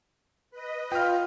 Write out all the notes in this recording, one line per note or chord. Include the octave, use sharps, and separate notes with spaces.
B4 D#5
F4 G5 F6